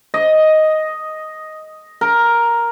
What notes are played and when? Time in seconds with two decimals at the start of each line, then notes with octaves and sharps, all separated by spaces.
0.14 D#5
2.01 A#4